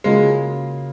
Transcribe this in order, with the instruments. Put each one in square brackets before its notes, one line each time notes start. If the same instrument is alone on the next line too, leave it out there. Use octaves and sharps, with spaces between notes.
[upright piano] C#3 F#3 A#3 F4 [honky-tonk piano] G#3